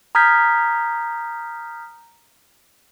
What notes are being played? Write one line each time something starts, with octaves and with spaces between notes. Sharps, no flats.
A#5 D#6 F6 G6 G#6 B6